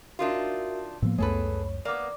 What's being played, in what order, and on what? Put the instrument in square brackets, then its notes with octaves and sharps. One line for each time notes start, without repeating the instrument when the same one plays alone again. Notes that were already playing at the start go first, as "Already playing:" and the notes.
[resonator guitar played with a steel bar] D4 D#4 F4 [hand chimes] F#4 A#4 E5
[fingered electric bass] A2 F3 A#3 [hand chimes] B3
[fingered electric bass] C#2 F#2 A3 [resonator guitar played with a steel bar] G#4 A4 B4 [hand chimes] C#5
[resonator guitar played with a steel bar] A#3 B3 [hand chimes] D5 D6